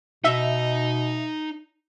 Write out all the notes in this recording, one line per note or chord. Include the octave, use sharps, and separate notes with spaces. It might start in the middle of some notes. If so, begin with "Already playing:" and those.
B2 D#4 D#5 E5